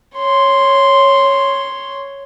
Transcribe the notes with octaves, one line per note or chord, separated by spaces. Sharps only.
C#5 C6